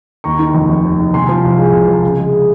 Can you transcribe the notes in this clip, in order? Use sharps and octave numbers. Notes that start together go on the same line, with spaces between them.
D#2 A#5 C#6
D#3
F1
F1
D#2
D#3
C3 G#5 C6
F3
C2
G#3 F5 G#5
C3
F3
C#3
G#3